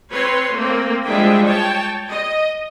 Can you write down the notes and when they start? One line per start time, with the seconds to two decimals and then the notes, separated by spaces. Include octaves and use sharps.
0.11 C4 B4 C#5 C6
0.53 A3 A#3 C4
1.06 F3 G3 G#3 D4 E5 G5
1.47 C#5 G5 A5
2.10 D#5